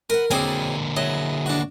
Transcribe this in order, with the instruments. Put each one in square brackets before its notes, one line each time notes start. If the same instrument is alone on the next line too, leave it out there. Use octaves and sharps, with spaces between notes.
[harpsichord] A#4 [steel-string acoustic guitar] B4 F#5
[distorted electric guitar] D3 A#3 [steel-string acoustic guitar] F#3 C4 D5 [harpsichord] E4 G#4 G#5
[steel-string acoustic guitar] F#3 E4 G#4 [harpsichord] D#5
[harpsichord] D4 F#4